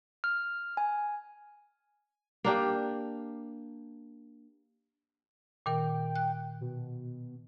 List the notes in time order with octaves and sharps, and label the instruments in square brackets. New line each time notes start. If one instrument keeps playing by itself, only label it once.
[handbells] F6
G#5
[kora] A#3 D4 G4
[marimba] A#2 D#3 A#4 [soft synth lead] G5
[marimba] F#6
[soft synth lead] B2